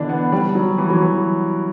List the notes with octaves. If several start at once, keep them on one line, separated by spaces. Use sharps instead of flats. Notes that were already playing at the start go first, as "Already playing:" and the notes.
Already playing: B2 D3 E3 D4
B3
G3
F#3
E3
F#3
E3